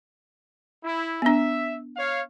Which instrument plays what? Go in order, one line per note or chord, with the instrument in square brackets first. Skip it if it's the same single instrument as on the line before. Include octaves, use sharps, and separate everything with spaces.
[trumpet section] E4
[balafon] B3 D4 [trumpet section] E5
[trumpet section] C#5 F5